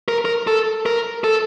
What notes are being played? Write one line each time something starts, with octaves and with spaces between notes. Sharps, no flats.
A#4
A#4
A4
A#4
A4